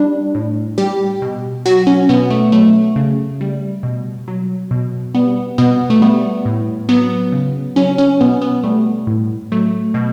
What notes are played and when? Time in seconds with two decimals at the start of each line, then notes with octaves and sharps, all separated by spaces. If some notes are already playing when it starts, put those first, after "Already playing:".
Already playing: G3 D4
0.35 A2
0.78 G3 G4
1.22 B2
1.66 F#3 F#4
1.87 C#4
2.09 B2 B3
2.31 A3
2.52 F#3 A3
2.96 C#3
3.41 G3
3.83 B2
4.28 F#3
4.71 B2
5.15 G3 B3
5.58 B2 B3
5.90 A3
6.02 G3 B3
6.45 A2
6.89 F#3 B3
7.32 C#3
7.76 F#3 C#4
7.98 C#4
8.20 B2 B3
8.41 B3
8.64 G3 A3
9.07 A2
9.52 F#3 A3
9.94 B2